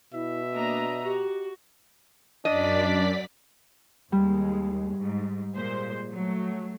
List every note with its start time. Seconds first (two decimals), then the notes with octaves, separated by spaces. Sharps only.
0.14 B2 E4 E5
0.54 A#3 D4 D#5 A#5
1.05 F#4 G4
2.45 F#2 D4 D5 D#5 B6
4.12 D#2 G3 G#3
4.96 G#2
5.54 A#2 G#3 C5
6.11 F#3 A3